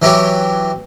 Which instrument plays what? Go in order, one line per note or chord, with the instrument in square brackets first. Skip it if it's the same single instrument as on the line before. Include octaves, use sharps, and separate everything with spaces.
[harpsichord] E3 F#3 E4 F#4 G4 C#5